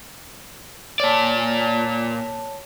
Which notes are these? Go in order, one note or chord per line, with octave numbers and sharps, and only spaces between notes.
A#2 C#5 D5 A5